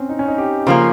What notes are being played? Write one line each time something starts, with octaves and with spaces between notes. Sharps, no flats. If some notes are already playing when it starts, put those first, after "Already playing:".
Already playing: C4 C#4
D#4
C#4
D#4
G4
C#3 F3 A#3 C5